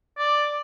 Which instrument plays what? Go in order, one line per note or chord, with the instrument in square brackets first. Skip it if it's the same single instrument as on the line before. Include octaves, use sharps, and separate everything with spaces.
[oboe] D5